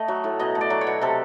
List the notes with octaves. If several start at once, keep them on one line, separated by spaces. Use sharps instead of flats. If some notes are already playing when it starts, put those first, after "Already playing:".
Already playing: A3 D#5
F#3
A2
B2 D#5
A3
D5
F#3
C#5
B2
C3 A4